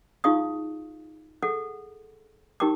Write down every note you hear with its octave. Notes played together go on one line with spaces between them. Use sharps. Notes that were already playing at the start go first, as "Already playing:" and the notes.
D#4 F4 G#4 F5 C#6 D#6
G#4 A4 F#5 D6
D#4 G4 A#4 G5 C#6 D6